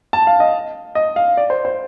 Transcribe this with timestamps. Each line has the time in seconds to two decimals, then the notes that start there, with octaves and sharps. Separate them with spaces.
0.13 A5
0.27 F5
0.40 D#5
0.95 D#5
1.16 F5
1.37 D5
1.50 C5
1.65 C5